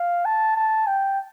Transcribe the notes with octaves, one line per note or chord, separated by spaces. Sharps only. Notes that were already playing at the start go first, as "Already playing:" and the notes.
Already playing: F5
A5
A5
G5